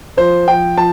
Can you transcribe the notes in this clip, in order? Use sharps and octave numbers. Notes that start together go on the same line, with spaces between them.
F3 C5
F3 G5
F3 A5